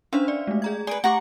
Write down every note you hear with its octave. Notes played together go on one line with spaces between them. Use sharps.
C#4 D4 C5 E5 F5
D5
G#3 A3
G#4 A#5 G#6
G#4 B4 D5 D7
A3 G4 F#5 A#5 C#6 D6